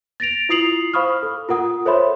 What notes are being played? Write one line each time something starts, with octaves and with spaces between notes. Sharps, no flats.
A6 A#6 D7 F7
E4 F4 D#6 C7 F7 F#7
C5 F5 B5 C#6 D#6 F6
A4
F4 A#4 F#5 D#6
A4 C5 C#5 E5 B5 C6